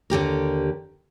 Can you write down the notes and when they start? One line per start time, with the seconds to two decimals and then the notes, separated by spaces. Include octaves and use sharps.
0.10 D#2 D3 G4 A#4